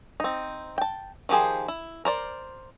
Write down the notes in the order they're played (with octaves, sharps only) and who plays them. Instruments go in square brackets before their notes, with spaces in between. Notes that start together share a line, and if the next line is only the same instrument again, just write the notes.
[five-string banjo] C4 D#4
G5 A5
D#3 F3 G4 G#4 C5
E4
A#4 C5 D5